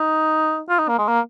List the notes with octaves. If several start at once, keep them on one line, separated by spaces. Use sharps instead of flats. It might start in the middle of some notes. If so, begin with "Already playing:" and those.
Already playing: D#4
F4
D#4
A#3
G#3
A#3